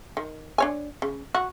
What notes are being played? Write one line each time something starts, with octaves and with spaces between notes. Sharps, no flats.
D#3
D4 C#5 G#5
C#3
F#4